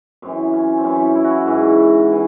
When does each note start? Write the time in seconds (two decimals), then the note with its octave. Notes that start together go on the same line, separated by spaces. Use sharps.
0.22 F#2 E3 C4
0.53 C#4
0.77 C4
0.84 F#2 E3 C#4
1.00 C#4
1.15 E4
1.24 F#4
1.30 E4
1.46 G#2 E3
2.12 E3